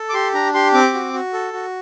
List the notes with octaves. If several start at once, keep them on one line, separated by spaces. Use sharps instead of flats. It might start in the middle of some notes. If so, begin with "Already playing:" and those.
Already playing: A4
D6
G4 C6
D4 A#5
G4 C6
C4 D6
F#4
F#4
A4
F#4